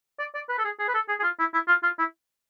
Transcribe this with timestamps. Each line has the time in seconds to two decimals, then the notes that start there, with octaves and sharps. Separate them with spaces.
0.19 D5
0.35 D5
0.49 B4
0.59 A4
0.65 G#4
0.79 G#4
0.88 B4
0.95 A4
1.09 G#4
1.20 G#4
1.23 F4
1.39 E4
1.54 E4
1.68 F4
1.83 F4
1.99 E4